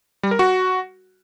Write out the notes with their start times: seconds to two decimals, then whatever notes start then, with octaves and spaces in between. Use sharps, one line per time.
0.23 G3
0.31 A#4
0.39 F#4